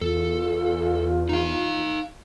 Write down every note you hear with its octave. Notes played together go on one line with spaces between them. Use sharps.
E2 F4 A4
D#4 F5